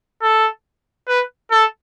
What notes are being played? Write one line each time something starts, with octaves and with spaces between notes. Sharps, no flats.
A4
B4
A4